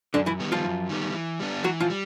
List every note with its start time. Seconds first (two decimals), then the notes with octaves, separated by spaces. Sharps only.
0.14 F#2 D3 D4
0.26 E3 E4
0.40 D#3 G3 B3
0.52 F3 F4
0.64 F#2
0.89 D#3 G3 B3
1.14 E3
1.40 G3 B3 D4
1.64 E3 F#3 F#4
1.80 F3 F4
1.90 G3